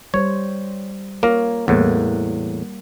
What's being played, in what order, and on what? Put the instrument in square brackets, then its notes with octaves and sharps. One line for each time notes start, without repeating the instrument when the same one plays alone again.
[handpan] G3 C5 [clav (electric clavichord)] C#5
[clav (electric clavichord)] A#3 A#4 [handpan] F4 C#5
[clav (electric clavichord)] E2 A2 [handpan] G3 A#3 F#5